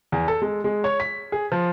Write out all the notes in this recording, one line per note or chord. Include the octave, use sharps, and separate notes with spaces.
E2
A4
G#3
G#3
C#5
B6
G#4
F3